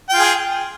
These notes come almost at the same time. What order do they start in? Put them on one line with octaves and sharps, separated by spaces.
G5 F4 G#4